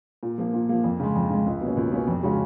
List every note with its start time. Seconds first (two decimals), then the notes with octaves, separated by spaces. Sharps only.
0.23 A#2
0.38 F3 A#3
0.54 A#2
0.69 F3 A#3
0.84 F2
0.99 C#3 G#3
1.16 F2
1.30 C#3 G#3
1.46 C#2
1.61 B2 A#3 C#4
1.77 C#2
1.92 B2 A#3 C#4
2.08 F2
2.23 C#3 G#3 C#4 F#4